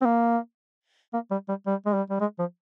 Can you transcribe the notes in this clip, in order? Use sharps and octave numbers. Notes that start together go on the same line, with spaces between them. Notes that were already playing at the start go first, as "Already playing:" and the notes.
C4
A#3
A#3
G3
G3
G3
G#3
G3
G3
G#3
F3